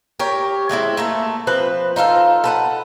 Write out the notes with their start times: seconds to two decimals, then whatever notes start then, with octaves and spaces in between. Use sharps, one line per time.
0.19 G4 A#4 C#5
0.69 G#3 A3 C4 E4
0.97 A3 A#3 A4
1.47 F3 C4 B4
1.96 D#4 F4 A4 F5
2.44 A4 B4 F#5